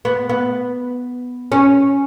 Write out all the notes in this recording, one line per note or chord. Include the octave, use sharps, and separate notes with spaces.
B3
B3
C#4